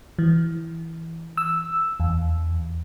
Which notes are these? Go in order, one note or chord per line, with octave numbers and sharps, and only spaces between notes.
E3
E6
E2